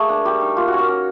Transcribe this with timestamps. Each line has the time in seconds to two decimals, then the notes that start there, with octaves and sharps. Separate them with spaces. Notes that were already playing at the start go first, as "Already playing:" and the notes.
Already playing: A3 A#3 G#4
0.09 D4
0.25 G3 G4
0.41 D#4
0.56 A#3 F4
0.68 F#4
0.73 C#4
0.78 A#4
0.88 C#4